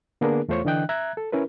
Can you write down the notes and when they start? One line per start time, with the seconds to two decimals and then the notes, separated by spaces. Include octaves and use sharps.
0.21 D3 A#3 B3 D4 G#4 A#4
0.48 E2 A3 F4 C5 C#5 C#6
0.65 D3 E3 D4 D#5 G5 F#6
0.89 E5 A#5 F#6 G#6
1.17 A4
1.32 C#4 E4 A#4 B4